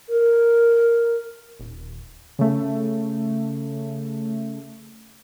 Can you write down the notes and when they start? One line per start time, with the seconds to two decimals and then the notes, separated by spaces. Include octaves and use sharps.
0.08 A#4
1.60 D#1
2.39 C#3 A3